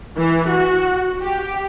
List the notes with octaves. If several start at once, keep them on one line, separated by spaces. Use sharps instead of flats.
E3
F#4
G4